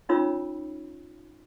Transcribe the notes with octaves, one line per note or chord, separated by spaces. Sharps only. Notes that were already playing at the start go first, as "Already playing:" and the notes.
C#4 D#4 F4 C#5 B5 E6